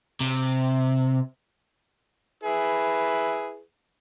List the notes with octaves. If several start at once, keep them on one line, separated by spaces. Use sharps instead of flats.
C3
E4 G#4 B4